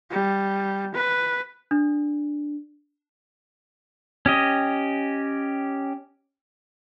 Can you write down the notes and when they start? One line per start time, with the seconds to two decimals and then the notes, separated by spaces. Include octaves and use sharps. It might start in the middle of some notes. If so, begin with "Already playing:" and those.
0.11 G3
0.95 B4
1.71 D4
4.26 C#4 G4 D#5